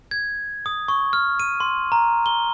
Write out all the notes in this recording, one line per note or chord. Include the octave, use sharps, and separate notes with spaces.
G#6
D#6
C#6
F6
D#7
C6
A#5
G7